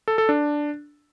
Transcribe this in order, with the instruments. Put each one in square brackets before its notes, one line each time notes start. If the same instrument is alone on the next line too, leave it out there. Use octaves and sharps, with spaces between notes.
[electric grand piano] A4
A4
D4